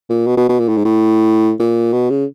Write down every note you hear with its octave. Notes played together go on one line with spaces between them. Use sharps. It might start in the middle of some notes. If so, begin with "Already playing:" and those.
A#2
B2
B2
B2
A#2
A2
G#2
A2
A#2
B2
C#3